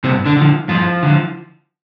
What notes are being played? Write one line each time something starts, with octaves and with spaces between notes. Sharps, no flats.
G2 C3 C4
D3 D4
D3 F3
G2 F3 F4
D3 F3